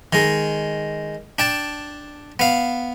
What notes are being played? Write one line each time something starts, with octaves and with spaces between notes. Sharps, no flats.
D#3 G#3
D4 G5 A5
B3 F5